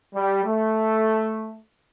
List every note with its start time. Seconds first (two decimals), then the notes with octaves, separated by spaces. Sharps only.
0.14 G3
0.45 A3